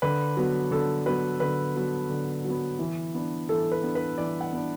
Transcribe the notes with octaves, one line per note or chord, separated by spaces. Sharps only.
D3 B4
F#3 B3
D3 A4
F#3 B3 B4
D3 B4
F#3 B3
D3
F#3
B3
E3
B3 D4
E3 A4
B4
B3 D4
B4
E3 D5
F#5
B3 D4